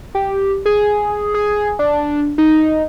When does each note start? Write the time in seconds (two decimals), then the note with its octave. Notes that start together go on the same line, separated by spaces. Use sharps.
0.15 G4
0.65 G#4
1.34 G#4
1.79 D4
2.38 D#4